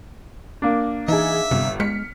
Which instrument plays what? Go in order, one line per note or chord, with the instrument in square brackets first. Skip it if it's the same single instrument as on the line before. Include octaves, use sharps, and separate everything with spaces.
[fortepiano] A#3 D4
[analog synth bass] E3 [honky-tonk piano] D#4 G#4 [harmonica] E5
[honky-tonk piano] G1 [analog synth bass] C3
[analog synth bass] G#3 [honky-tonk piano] F6 B6 C#7